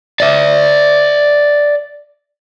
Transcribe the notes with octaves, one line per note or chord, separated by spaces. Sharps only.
D5 E5